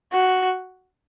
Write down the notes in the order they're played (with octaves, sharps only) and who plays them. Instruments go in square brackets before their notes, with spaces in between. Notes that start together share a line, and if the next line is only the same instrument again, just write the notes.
[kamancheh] F#4